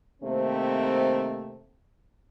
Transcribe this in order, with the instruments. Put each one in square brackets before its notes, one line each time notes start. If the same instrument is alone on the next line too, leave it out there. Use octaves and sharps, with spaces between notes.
[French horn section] C3 D#3 A3 A#3 C4